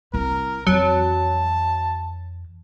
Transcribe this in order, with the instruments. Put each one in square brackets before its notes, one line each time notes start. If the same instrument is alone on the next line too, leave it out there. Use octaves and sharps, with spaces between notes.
[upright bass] C2 E4 [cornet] A#4
[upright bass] F2 E3 [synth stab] F#3 [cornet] A5